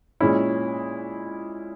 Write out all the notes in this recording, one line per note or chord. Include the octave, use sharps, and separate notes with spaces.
A#2 G#3 C#4 E4